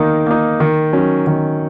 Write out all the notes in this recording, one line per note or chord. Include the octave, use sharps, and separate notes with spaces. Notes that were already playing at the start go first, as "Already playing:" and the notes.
Already playing: D#3 A#3 D#4
A#3 D#4
D#3
F#3 C#4
D#3